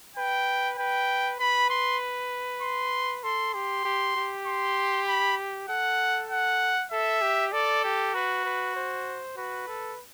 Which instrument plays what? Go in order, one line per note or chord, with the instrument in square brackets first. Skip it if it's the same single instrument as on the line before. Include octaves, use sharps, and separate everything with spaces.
[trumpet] B4 [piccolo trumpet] G5
[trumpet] B4 [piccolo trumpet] G5
[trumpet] B4 [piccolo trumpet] B5
[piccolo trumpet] C6
C6
[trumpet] A4 [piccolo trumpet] C6
[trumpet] G4 [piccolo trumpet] C6
[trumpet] G4
G4
[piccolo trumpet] C6
B5
[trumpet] A4 [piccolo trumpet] F#5
[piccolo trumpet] F#5
[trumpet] A4 [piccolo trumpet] E5
[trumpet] G4
[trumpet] A4 [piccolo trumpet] D5
[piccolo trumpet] G4
[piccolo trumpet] F#4 [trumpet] B4
[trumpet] B4
C5
[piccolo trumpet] F#4 [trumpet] B4
[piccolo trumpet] A4